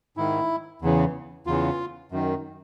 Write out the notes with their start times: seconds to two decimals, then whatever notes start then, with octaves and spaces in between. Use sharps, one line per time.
0.17 G#2 D#3 E4
0.82 E2 C#3 E3
1.47 E2 C#3 E3 F4
2.11 F#2 D#3